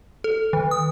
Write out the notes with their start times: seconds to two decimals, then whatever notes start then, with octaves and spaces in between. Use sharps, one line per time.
0.24 A4
0.53 D#3
0.71 D#6